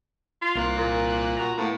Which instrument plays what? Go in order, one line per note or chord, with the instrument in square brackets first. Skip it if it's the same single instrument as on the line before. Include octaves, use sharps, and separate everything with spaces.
[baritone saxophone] F4
[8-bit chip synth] C2 A#3 F#6
[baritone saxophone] A#2
[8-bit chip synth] F#4 A#5
[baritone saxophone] A2 [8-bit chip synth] A#3 B3